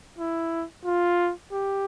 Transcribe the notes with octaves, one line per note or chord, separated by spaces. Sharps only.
E4
F4
G4